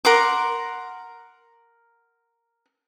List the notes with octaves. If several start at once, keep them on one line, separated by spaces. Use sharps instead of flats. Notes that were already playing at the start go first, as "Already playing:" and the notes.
A#4 F#5 C6 D6